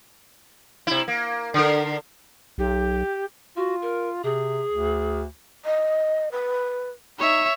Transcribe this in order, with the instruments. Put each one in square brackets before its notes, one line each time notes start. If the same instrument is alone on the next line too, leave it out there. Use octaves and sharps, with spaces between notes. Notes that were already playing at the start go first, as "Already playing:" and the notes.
[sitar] C3 E4
A#3
D3 A#4
[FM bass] B1 [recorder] G4
[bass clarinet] F4 [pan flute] F#4
[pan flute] A#4
[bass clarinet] C3 [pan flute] G#4
[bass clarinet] D2
[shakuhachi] D#5
B4
[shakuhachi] D#4 [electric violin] C#5 E5